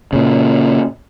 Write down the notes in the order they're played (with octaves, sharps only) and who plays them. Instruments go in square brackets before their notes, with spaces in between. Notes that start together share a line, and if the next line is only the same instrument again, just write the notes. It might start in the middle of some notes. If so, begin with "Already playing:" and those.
[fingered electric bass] A#2 C#3